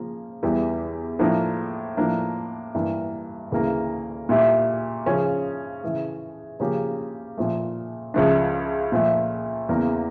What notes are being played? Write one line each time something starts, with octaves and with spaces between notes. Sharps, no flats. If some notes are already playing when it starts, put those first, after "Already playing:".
Already playing: C#3 F3 A#3
E2 E3 G3
A2 F3 A#3 D4
A2 F3 A#3 D4
G2 E3 A#3
D2 C#3 E3 A#3
A#2 A3 E4 G4
C#3 F3 C#4
C#3 E3 A3
C#3 F3 A#3 C#4 G4
A#2 F3 A3
C#2 C#3 F3 A3 D4
A#2 F3 A3
E2 C#3 E3 A#3